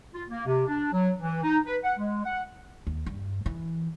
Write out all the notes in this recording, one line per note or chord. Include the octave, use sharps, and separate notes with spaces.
F4
A#3
C3
D4
F#3
E3
D#4
B4
F#5
G#3
F#5
D#2
G2
E3